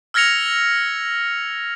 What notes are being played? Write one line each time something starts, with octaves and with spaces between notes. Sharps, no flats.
E6 F6 G#6 A#6 C#7 F7